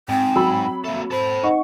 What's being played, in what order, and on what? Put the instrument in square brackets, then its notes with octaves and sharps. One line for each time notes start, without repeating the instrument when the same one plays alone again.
[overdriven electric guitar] G#2 [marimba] C4 [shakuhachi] G5
[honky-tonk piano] F#3 B5 [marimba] E6
[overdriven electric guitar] A#3 A4 [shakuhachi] E5
[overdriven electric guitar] A4 B5 [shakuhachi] C5
[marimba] D#4 D#5 F#5 [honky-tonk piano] C#6